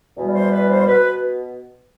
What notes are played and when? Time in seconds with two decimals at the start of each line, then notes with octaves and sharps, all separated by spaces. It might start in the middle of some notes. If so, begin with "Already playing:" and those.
0.17 E2 B2 G3
0.35 C5
0.52 B4
0.70 C5
0.87 B2 B4